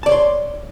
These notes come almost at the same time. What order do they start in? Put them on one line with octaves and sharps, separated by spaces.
A5 D5 C#5 C6